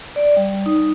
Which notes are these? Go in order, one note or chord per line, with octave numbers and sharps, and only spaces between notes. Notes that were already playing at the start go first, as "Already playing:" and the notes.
D5
G3
D#4